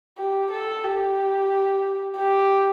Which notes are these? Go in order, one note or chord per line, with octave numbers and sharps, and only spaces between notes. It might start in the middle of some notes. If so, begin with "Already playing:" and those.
G4
A4
G4
G4